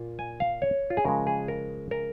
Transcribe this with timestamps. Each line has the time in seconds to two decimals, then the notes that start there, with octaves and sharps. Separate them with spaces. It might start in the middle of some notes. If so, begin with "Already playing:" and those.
Already playing: A#2 A#3 F4
0.19 G#5
0.40 F5
0.62 C#5
0.90 F4
0.97 G#4
1.05 C#3 F3 G#3 A#4
1.27 G#4
1.48 A#4
1.91 A#4